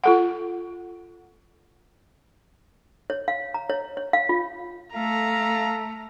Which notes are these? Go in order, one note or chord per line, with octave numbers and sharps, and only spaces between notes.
F4 A4 F#5
C#5
F5
A#5
C#5
C#5
F5
F4
A3 A4 F5 A#5